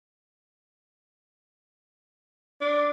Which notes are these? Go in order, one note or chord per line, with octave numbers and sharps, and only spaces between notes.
D4